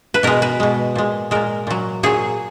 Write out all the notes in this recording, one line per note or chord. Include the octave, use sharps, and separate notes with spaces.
B4
B2 G#3 A#4
B4
B2 G#3
A#2 G#3
A#2 G#3 A#4
A#2 F#3
A#2 F#3 G#4